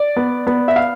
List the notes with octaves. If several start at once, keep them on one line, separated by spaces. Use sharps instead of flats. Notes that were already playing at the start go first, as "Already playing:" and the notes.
Already playing: D5
B3
B3
E5
F5